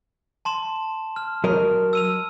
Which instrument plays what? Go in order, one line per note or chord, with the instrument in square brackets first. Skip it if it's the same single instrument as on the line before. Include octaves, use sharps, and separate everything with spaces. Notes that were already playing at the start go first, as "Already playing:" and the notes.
[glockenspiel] A5 C6 E7
F6
[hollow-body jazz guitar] F#3 A#4 D#5
[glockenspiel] E6 D#7 F7